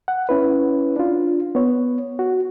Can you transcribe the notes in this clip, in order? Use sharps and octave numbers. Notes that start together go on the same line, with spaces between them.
F#5
C#4 E4 B4
D4 F4
B3 C#5
F#4